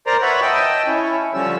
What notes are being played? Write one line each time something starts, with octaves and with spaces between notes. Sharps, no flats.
A#4 C5 D5 A#5
B4 C#5 E5 F#5 B5
D#5 G5 A5 E6
C#4 E4
D3 F3 G3 C#4 E6